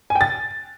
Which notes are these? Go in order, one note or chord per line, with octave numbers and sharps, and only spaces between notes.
G#5
G5
A6